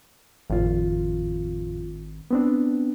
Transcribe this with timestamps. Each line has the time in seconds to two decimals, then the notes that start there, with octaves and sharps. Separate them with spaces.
0.50 G#1 F2 A2 F4
2.31 B3 C4 D4